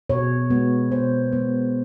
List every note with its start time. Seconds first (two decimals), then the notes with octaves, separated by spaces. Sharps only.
0.10 B2 C#5
0.50 G#3 B3
0.92 B2 C5
1.33 G#3 B3